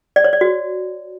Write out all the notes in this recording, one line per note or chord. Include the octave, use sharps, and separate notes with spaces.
D5
C#5
D5
F#4